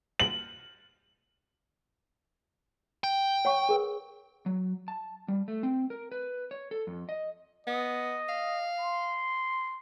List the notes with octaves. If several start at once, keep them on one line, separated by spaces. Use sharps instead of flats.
F#7
G5
C#5 F#5 C#6
G#4 A#4 B4
F#3
A5
G3
A3
C4
A#4
B4
C#5
A4
F2
D#5
B3 D#5
F5
C6